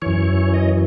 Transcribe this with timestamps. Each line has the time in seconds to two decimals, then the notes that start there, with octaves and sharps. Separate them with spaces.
0.02 F#2 E3 C#5
0.54 D#5